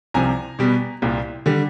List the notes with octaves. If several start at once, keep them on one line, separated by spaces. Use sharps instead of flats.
C2 C3 F3 G#5 A#5
B2 G3 B3
C2 A#2 G3
D3 G3